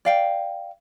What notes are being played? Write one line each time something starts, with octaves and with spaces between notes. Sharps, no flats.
D5 F5 G5